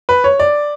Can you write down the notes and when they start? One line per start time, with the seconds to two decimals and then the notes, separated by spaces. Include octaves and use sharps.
0.09 B4
0.24 C#5
0.39 D5